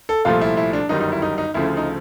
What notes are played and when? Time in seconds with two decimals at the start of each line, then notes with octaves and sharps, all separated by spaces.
0.09 A4
0.25 C2 A#2 F3 A3 F4
0.41 E4
0.57 E4
0.73 D4
0.89 G1 F#2 D#3 G3 D#4
1.01 D#4
1.12 E4
1.22 D#4
1.38 D#4
1.54 D2 C#3 F3 A3 E4
1.77 D#4